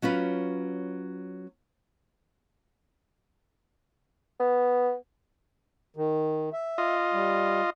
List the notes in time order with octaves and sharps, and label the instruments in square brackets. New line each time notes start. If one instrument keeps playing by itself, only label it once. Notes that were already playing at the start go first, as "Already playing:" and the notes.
[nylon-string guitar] F#3 C#4 F4 B4
[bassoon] B3
[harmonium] D#3
E5
[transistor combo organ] F4 D#5
[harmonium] G3